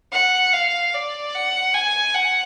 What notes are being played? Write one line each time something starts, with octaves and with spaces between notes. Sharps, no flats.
F#5
F5
D5
F#5
G#5
F#5